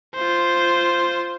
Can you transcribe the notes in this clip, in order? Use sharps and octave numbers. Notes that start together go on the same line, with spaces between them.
F4 C5